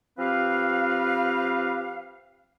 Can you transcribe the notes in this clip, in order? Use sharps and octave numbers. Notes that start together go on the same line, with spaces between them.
F3 C4 G4 B4 F5